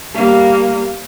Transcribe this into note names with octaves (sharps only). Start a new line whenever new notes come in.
G3 A#3